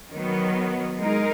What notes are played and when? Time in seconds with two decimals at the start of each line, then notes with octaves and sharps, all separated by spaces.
0.12 D#3 F#3 B3
0.96 G#3 D#4 A#4